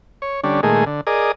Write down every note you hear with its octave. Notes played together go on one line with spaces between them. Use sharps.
C#5
D3 G3 C#4 D4
A#2 D#3 G#3 A3 G#4
D3
G#4 A#4 D5 D#5